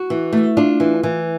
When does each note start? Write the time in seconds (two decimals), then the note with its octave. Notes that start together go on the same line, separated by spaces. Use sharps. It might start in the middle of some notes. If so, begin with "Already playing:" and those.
Already playing: F#4
0.10 E3
0.33 A3
0.57 D4 F4
0.80 E3
1.03 E3